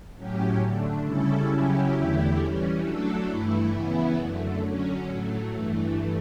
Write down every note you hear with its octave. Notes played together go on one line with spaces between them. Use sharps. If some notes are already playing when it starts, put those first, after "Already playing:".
A2 F#3 C#4 G4
D3 A3 D4
C#3 G3 C#4 E4 A4
C#3 F#3 C#4 E4 G4
E2 D3 A3 E4 G4
E3 G3 C#4
F#3 A3 D4 A4
G2 E3 A3 E4
C#3 E3 B3 E4
F#2 D3 A3
D3 F#3 C#4
A2 F#3 A3
G2 E3 A3